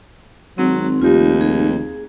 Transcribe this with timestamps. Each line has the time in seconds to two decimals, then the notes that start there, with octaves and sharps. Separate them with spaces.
0.58 G#1 F#3 C4
1.02 F1 D#2 F4 G4
1.41 G#4